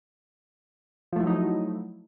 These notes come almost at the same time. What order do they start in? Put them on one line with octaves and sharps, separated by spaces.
F3 A3 E4 F#3 D#4